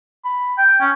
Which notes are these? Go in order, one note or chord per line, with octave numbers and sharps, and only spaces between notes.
B5
G5
C#4